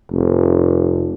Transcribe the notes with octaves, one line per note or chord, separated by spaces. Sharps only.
F1